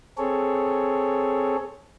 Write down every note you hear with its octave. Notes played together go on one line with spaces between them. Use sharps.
C4 G#4 A4 C#5